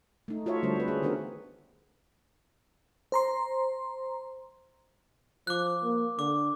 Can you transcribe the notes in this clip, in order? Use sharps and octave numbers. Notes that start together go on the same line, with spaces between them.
A3 D#4
F4 F#4 A4 C#5 E5
D3 G3 A3 D4 A4 C5
C4 B4
A3 C#4 G#4
D#3 B3 D4 F#4 A#4 C#5
C5 A#5 C6
F3 D6 F#6
A#3
D3 D6